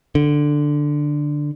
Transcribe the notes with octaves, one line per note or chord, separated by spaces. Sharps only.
D3